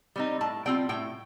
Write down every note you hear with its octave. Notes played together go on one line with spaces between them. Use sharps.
G3 C4 D#4
A2 A5
G3 C4 F4 G5
A2 G5